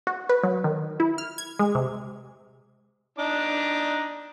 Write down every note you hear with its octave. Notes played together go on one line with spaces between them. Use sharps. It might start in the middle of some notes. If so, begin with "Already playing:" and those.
F#4
B4
F#3
D#3
E4
F6
G#6
G#3
C3
D4 D#4 D6